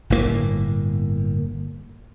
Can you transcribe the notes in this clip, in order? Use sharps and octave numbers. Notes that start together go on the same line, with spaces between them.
G1 A2 D3 A#3